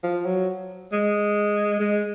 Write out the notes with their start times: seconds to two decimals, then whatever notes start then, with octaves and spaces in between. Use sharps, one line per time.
0.04 F3
0.26 F#3
0.92 G#3
1.80 G#3